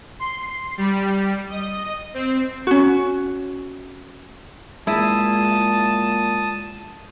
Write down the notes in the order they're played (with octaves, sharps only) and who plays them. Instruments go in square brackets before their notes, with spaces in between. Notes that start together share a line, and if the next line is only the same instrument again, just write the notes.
[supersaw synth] C6
G3
D#5
C4
[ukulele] C#4 F#4
[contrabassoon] A#2 [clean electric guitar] G#3 [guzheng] E4 [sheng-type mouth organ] A5 D#6